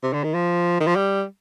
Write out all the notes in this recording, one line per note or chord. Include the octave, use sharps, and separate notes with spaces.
C3
D3
D#3
F3
D#3
F3
G3